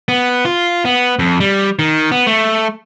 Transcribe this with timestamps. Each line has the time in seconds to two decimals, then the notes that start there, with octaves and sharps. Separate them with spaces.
0.08 B3
0.45 F4
0.85 B3
1.19 F2
1.40 G3
1.79 D#3
2.12 B3
2.27 A3